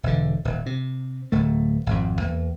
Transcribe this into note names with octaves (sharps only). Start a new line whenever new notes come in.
E1 B2 D3
D#1 D#2
C3
D1 A3
G#1 F2
E2 A#3